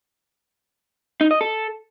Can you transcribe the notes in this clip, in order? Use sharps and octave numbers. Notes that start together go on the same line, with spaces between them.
D#4
D#5
A4